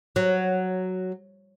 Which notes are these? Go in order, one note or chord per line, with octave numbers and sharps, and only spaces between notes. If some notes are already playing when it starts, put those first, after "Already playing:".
F#3